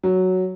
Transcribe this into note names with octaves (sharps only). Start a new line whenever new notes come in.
F#3